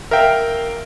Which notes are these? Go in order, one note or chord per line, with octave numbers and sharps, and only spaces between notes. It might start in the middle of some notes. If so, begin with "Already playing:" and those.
A#4 E5 F5 G5